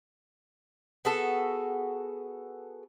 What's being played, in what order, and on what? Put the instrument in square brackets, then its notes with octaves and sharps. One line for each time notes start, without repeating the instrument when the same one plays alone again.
[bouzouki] B3 F#4 G#4 A4